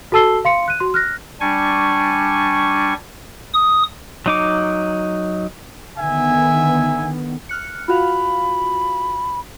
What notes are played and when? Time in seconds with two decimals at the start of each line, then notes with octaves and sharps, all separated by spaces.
0.12 F#4 A4 A5 E6 C7 G7
0.45 F5 C6 C#7
0.68 F#6 D#7
0.80 F#4 C6
0.94 F6 F#6 A#6
1.40 G3 D4 G#5 C#6
3.53 D#6
4.26 F#3 D#4 D6
5.98 D3 D#3 B3 E5 G#5
7.49 F6 F#6 C#7
7.88 F4 F#4 F5 B5